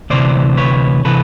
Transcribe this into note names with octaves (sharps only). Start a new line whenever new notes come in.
D2 C3 E3 C5 D5
B4 C#5
C3 E3 A4 B4